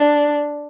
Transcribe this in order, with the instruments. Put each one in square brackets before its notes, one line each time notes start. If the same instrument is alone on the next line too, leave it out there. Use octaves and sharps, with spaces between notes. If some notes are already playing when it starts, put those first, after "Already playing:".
Already playing: [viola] D4